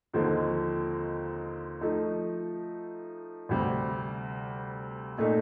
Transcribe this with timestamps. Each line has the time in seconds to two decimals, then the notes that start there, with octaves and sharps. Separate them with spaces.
0.13 D#2 D3 F3 C4 D#4
1.81 F3 A3 D#4
3.49 D2 C3 G3 C4
5.18 A#2 A3 D#4